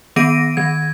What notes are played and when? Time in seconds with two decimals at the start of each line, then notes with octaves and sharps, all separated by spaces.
0.16 D#3 B3 A#6 D7 D#7
0.57 D#3 G#6